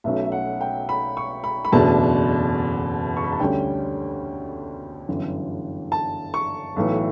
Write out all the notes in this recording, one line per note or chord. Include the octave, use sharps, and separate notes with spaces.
B1 B2 A3 C#4 E5
E5
F#5
G5
B5
C#6
B5
B5
F#1 E2 B2 A3 D4 A5
C#6
B5
A5
D2 D3 G3 C#4 G5
G1 F#2 E3
A5
C#6
B1 A2 E3